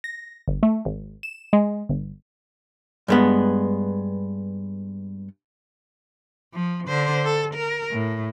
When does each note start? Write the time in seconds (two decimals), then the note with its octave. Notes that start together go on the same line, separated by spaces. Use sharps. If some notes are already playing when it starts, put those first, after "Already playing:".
0.04 A#6
0.48 G1
0.63 A3
0.85 G#1
1.23 E7
1.53 G#3
1.89 G1
3.08 G2 G#3 B3
6.54 F3
6.88 D3 C5
7.25 A4
7.54 A#4
7.91 A2